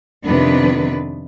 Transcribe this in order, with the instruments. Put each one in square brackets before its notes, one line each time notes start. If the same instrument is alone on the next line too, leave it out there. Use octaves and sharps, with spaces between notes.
[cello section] F2 C3 D#3 B3 D4 B4